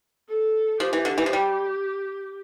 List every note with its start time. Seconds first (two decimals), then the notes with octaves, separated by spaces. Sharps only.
0.28 A4
0.80 F3 G4
0.93 E3
1.05 D3
1.18 E3
1.26 F3
1.33 G3